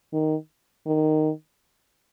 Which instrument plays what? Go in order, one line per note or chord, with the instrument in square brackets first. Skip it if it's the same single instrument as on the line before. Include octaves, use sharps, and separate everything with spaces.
[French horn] D#3
D#3